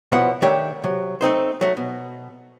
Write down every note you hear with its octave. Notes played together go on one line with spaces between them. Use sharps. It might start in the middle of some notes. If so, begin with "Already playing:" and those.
B1 B2 F3 B3 E4 F#5
D#3 A3 D4 G4 C#5 E5
C3 F#3
A3 C4 D#4 C5
F#3 A3
B2